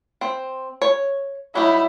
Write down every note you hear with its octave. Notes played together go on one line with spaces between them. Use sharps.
C4
C#5
F#3 G3 D#4 E4